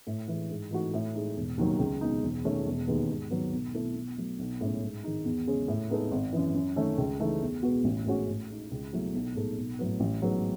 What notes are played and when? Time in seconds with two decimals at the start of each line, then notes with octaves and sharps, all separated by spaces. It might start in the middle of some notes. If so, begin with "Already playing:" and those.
0.07 A2
0.28 E3 G#3
0.50 G#2
0.71 E3 A3 D#4 F#4
0.94 A2
1.15 G#3 D#4
1.36 E1
1.58 D#2 D#3 F#3
1.79 C#2
2.01 B2 G#3 D#4
2.23 E1
2.45 E2 D#3 A3 C#4
2.65 E1
2.87 D#2 D#3 G#3 B3
3.10 G#2
3.30 D#3 F#3 B3
3.53 B1
3.74 B2 A3 E4 A4
3.96 B2
4.17 F#3 A3
4.39 B1
4.61 A2 G#3 C#4
4.82 G#2
5.04 D#3 G#3 D#4
5.25 E2
5.47 C#3 G#3 C#4
5.68 A2
5.90 G#3 B3 D#4 A4
6.11 G#1
6.33 F#2 E3
6.54 F#2
6.76 D#3 A3 C#4
6.98 C#2
7.19 C#3 E3 A3 D#4
7.42 E2
7.63 B2 G#3 B3 F#4
7.84 A1
8.06 A2 G#3 C#4 F#4
8.28 A2
8.49 G#3 D#4
8.71 C#2
8.93 B2 F#3 A3 E4
9.14 B1
9.35 A2 G#3 D#4 A4
9.57 B1
9.79 A2 F#3 B3
10.00 A1
10.22 G#2 F#3 B3